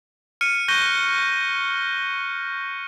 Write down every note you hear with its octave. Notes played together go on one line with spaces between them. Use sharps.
F6 C#7 D#7
C#6 F#6 G6 A#6 D#7 G7